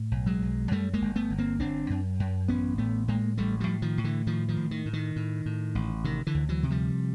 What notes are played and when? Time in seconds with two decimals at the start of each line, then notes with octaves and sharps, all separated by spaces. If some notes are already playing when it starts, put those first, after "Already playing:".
Already playing: A2
0.11 B1
0.26 F#3 G#3
0.42 B1
0.71 F#2 G3 A3
0.94 G#3 A#3
1.02 G1
1.16 A3 B3
1.30 G1
1.38 A#3 C4
1.60 G1 C4 D4
1.90 F#2
2.20 F#2
2.48 A1 B3 C#4
2.78 A2 A3 B3
3.08 A2 G#3 A#3
3.38 A1 G3 A3
3.60 F3 G3
3.67 A2
3.82 D#3 F3
3.98 A2
4.04 D3 E3
4.27 A2 D#3 F3
4.48 D#3 F3
4.57 A2
4.71 D#3
4.86 A2
4.93 D#3
5.16 A2
5.46 A2
5.75 A1
6.04 C3 D#3
6.27 D3 E3
6.35 D2
6.49 E3 F#3
6.63 C3
6.70 F3 G3